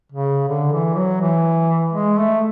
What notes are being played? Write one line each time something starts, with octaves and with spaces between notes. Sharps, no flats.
C#3
D3
E3
F#3
E3
G#3
A3